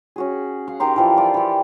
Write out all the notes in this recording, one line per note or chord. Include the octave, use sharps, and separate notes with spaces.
C#4 F#4 G#4
F5 F#5
D#3 G4 A#5 C6
E3 F3 D5
F4 D5
E3 G4